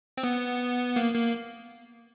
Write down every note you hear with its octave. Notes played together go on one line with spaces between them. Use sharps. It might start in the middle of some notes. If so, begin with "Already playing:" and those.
C4
B3
A#3
A#3